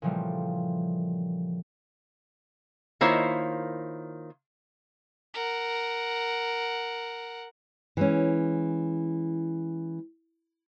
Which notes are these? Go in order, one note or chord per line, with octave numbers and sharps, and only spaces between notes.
A#2 C#3 E3 F3 G3 A3
D#3 A#3 E4 F4 C5 C#5
A#4 F#5
E3 G#3 C#4